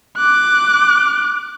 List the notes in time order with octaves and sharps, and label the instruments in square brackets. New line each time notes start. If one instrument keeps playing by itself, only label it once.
[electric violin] D6 F#6